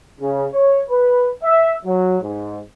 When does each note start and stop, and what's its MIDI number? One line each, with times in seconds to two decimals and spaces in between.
0.20 0.46 49
0.53 0.82 73
0.89 1.28 71
1.43 1.74 76
1.85 2.17 54
2.22 2.59 44